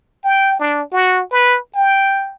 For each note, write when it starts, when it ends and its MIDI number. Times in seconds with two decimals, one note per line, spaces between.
0.24 0.57 79
0.60 0.83 62
0.92 1.22 66
1.31 1.59 71
1.75 2.34 79